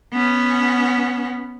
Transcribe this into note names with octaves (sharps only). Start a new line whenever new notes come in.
B3 C#4